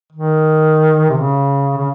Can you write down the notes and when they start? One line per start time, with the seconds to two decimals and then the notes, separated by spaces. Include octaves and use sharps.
0.12 D#3
1.10 C3
1.18 C#3
1.77 C#3